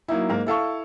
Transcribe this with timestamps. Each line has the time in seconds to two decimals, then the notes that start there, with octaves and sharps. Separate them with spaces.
0.08 F#3 A#3 D#4 E4
0.29 G#2 A#3 A#4
0.46 E4 A4 F5 C#6